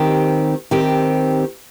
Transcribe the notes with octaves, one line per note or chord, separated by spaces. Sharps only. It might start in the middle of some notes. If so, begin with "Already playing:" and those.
Already playing: D#3 C4 G4
D#3 C4 G4